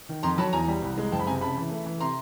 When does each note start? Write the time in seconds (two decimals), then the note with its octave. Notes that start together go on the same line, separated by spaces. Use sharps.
0.09 D#3
0.23 F2 A#5 C6
0.38 F#3 A5 B5
0.53 E2 G#5 A#5
0.67 G3
0.82 C2
0.98 G#3
1.12 F#1 G5 A5
1.20 B5
1.27 C3 G#5 A#5
1.41 C#3 A5 B5
1.57 E3
1.71 A3
1.86 E3
2.00 C3 A#5 C6